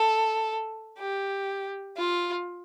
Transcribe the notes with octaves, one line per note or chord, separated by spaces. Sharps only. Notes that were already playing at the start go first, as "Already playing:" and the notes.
Already playing: A4
G4
F4